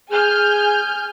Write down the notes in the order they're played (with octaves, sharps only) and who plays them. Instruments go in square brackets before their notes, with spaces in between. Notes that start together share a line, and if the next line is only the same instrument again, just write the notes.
[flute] G#4 [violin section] G#5 F6 G6